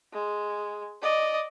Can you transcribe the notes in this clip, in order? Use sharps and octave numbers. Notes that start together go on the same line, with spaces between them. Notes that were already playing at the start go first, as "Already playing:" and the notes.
G#3
D5 D#5